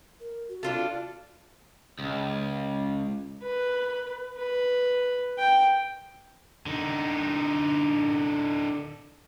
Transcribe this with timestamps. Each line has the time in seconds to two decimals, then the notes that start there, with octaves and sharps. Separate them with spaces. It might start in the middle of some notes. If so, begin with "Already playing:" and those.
0.20 A#4
0.49 F#4
0.63 D4 F4 A4
1.99 C#2
3.43 B4
4.37 B4
5.39 G5
6.66 D3 D#4